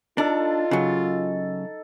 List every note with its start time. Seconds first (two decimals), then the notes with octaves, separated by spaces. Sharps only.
0.18 D4 D#4 F4 A4
0.71 C#3 F#3